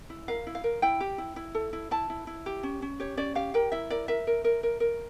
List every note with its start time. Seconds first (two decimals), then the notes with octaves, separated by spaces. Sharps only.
0.10 E4
0.28 A#4 F5
0.47 E4
0.55 F5
0.64 A#4
0.82 E4 G5
1.00 G4
1.18 E4
1.36 E4
1.55 A4
1.73 E4
1.91 E4 A5
2.10 E4
2.27 E4
2.46 G4
2.63 C#4
2.82 C#4
3.00 G4 C#5
3.17 C#4 D5
3.35 G4 F5
3.54 A#4 G5
3.72 E4 E5
3.90 A#4 D5
4.08 A#4 E5
4.27 A#4
4.44 A#4
4.63 A#4
4.80 A#4